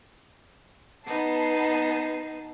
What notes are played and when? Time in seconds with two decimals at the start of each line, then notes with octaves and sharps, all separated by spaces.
1.07 B3 D#4 A5 C7